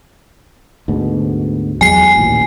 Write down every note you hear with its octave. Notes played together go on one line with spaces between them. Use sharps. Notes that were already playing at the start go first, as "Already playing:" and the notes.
D2 G#2 B2
E2 F#3 G#3 G#5 C7
A1 D#2 A#2